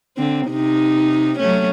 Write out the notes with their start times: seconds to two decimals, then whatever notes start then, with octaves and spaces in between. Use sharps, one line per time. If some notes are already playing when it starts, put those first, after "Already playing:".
0.18 D3 C4
0.48 C3 D#4
1.39 F#3 A3 C#4